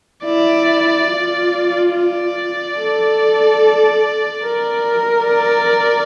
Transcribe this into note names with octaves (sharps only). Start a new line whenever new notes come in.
E4 D5
F4
D5
A4
A#4
D5